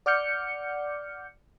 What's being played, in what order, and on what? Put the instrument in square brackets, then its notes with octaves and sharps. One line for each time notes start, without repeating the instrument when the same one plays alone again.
[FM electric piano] D5 F#5 D6 F6 G6 C#7